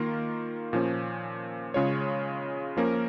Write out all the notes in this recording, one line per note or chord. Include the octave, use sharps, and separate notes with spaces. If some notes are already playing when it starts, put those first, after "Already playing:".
Already playing: D#3 A#3 F4 A#4
A#2 F3 C#4
C#3 G#3 F4 C#5
F3 A#3 C#4 A#4